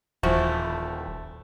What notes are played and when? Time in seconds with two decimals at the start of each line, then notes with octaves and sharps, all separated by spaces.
0.23 D#1 E3 F3 A3 F#4